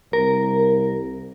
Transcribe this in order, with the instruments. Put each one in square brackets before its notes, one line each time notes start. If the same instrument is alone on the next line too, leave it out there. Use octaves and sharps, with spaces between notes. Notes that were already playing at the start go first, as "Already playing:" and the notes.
[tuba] C2 [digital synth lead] A#4